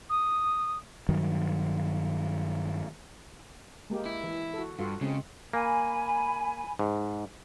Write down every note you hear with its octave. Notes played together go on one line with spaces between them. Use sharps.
D#6
G2 D#3 F#3
G#3 A#3 G4
E4
E3
F#4 A4
G2 F4 F#4 A4
C#3 G#3 C4
A#3 G#5 B5
G#2